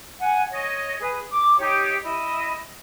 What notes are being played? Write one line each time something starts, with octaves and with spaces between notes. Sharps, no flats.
F#5 G#5
C#5 D#5
G#4 B4
D6
D#4 G4 C#5
E4 D#5